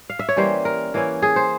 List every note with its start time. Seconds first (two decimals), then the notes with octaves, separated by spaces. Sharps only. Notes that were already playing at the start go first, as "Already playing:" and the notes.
0.09 F5
0.19 E5
0.29 C#5
0.36 E3 G3 A#3 C#4 C5
0.65 A#4
0.94 E3 A#3 C#4 E4
1.22 G#4
1.36 C5